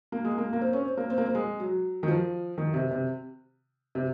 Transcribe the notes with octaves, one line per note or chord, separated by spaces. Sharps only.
A#3
G#3
A#3
A#3
C4
C#4
C4
A#3
C4
A#3
C4
G#3
F#3
D#3
F3
D#3
C3
C3
C3